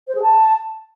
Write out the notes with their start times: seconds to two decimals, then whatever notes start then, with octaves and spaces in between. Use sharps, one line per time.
0.08 C5
0.15 G#4
0.22 A5